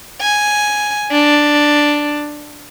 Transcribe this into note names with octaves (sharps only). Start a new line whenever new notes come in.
G#5
D4